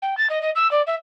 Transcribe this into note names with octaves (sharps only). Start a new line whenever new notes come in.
G5
A6
D#5
D#5
E6
D5
E5